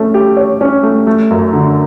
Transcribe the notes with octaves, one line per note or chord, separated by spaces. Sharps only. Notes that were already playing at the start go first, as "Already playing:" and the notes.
Already playing: A3 C#4
G4
C#5
C#4
A3
A3
F#2
D3